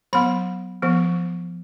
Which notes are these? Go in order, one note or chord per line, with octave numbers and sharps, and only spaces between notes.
F#3 B3 B5
F3 B3